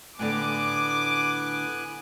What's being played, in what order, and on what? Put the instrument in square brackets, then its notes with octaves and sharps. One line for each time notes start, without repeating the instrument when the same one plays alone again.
[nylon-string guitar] A2 D3 [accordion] B3 G#5 F#6 [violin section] D6